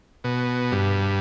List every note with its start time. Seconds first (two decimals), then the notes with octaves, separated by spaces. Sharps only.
0.24 B2
0.72 G2